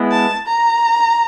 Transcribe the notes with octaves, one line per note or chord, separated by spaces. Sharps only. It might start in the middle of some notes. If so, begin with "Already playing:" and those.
Already playing: G#3 B3 E4
A5
A#5